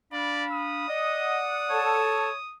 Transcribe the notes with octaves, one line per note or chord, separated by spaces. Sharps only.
D4 D5 F5 B5
D#6
D5 D#5 F#5
A4 C#5 A5